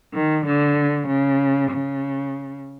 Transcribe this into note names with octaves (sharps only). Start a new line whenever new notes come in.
D#3
D3
C#3
C#3